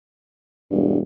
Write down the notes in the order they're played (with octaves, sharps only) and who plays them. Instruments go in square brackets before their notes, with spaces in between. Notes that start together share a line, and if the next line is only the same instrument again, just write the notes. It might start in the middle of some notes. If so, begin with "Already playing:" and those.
[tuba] E1 [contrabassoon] G2